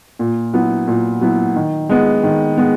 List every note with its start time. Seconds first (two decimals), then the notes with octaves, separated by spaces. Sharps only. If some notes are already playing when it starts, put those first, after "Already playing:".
0.19 A#2
0.53 F#3 B3 E4
0.87 A#2
1.21 F#3 B3 E4
1.55 D#3
1.89 G#3 B3
2.23 D#3
2.58 G#3 B3